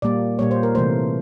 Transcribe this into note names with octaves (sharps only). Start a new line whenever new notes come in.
A#2 G3 A#3 D5
A#2 G3 A#3 C#5
C5
A#4
C3 E3 A3 C5